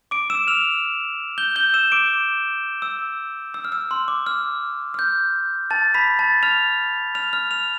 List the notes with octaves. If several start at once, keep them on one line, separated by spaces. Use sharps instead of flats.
D6 D7
E6 E7
F6 F7
G6 G7
G6 G7
E6 E7
D6 D7
E6
E6
F6
E6
C6
D6
F6
F6
G6
A5 A6
B5 B6
A5 A6
F6 F7
F6 F7
F6 F7
F6 F7